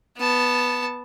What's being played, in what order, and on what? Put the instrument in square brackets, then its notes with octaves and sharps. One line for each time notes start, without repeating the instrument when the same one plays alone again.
[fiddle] B3 A5